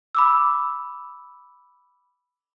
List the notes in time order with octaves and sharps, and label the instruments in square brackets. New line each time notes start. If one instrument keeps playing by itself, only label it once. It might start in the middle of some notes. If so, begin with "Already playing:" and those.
[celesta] B5 D6 E6